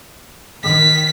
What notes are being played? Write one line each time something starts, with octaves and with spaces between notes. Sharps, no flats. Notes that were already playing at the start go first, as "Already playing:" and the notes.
D#3 B6